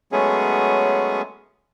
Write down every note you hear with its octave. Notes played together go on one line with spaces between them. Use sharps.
F#3 G#3 A3 B3 C#4 G#4